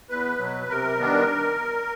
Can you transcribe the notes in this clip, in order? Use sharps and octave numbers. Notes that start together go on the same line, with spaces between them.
E2 B4
B2 F#3
C3 A#4
D#3 G3 B3 D4